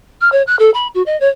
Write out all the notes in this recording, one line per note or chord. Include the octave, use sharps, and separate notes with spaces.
F6
C#5
F#6
A4
B5
F#4
D#5
C#5